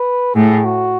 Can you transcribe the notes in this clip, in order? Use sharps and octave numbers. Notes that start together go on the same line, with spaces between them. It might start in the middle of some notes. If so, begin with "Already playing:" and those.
Already playing: B4
A2 G#4
F#4